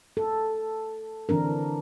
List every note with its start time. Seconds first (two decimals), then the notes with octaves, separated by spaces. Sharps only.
0.17 A4
1.29 D3 E3 C4 D4 A#4